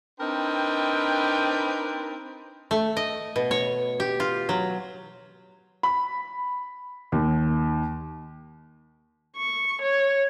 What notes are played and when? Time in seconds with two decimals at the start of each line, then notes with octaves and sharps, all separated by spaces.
0.20 C4 D4 D#4 A#4 B4 G5
2.71 A3
2.97 D#5
3.36 B2
3.51 C#5
4.00 G4
4.20 F4
4.49 F#3
5.83 B5
7.12 D#2
9.36 C#6
9.82 C#5